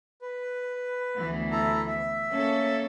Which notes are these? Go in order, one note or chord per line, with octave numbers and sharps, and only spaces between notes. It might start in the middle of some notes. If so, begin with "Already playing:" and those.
B4
D2 E3 B3
E4 A4 A#5
E5
A#3 C#4 A4